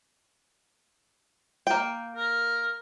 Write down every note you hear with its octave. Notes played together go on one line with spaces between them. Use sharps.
A#3 G5
A#4